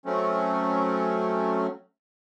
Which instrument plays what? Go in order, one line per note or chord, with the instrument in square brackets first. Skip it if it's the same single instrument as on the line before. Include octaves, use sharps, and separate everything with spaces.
[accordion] F#3 A3 C4 C#4